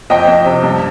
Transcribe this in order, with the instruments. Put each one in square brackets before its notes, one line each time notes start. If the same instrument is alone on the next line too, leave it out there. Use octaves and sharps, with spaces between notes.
[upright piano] F2 D#5 G5
F2
C3
G2